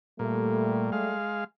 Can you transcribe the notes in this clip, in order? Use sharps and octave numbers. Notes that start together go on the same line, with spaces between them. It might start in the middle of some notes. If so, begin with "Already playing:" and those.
A#2 G3 A3
G#3 F5